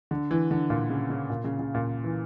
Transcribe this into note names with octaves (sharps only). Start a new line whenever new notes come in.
D3
E3
D3
A#2
C#3
C#3
A#2
C#3
C#3
A#2
E3